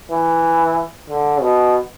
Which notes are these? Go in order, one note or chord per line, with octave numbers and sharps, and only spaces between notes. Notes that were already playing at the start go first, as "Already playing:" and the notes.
E3
D3
B2